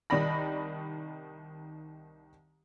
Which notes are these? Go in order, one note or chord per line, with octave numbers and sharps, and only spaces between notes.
C2 D#3 D#4 D5 B5 A#6